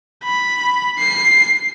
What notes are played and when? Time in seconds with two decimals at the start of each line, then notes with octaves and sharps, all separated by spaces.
0.24 B5
0.99 C7